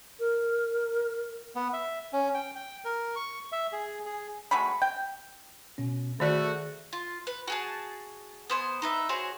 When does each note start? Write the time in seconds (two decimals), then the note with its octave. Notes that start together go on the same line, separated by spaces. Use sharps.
0.20 A#4
1.55 B3
1.73 E5
2.13 C#4
2.34 G5
2.56 G5
2.85 A#4
3.16 C#6
3.52 E5
3.72 G#4
4.06 G#4
4.51 F#3 G#3 A3 B5
4.82 G5
5.78 B2 C#4
6.20 D#3 A3 F#4 G#4 D5
6.93 F4
7.27 B4
7.48 F#4 G#4 A5
8.50 B3 C5 G#5
8.82 D#4 B4 E5
9.09 F#4 G#4 C5 C#5